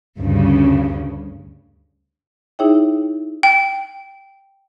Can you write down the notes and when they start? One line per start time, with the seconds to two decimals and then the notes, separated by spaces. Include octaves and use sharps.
0.18 D2 G2 C#3
2.59 D#4 E4 G#4 C#5 E5 G5
3.43 G5